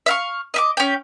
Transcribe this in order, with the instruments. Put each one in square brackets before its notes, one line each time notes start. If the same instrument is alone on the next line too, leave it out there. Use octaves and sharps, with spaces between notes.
[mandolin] E5 F5 C#6
D#5 E5 D6
C#4 G5